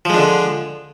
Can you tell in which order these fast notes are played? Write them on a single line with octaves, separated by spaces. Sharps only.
F3 G#3 D4 D3